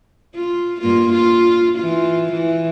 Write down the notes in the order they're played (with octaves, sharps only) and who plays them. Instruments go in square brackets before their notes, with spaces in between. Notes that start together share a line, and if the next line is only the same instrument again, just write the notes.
[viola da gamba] F4
G2 A#3 F4
F4
E3 F4
E3